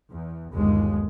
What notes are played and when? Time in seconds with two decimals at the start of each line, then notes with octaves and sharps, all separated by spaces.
0.10 E2
0.52 G1 D#2 G#3